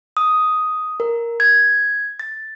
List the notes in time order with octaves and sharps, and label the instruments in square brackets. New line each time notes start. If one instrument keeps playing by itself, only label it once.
[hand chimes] D#6
A#4
G#6
A6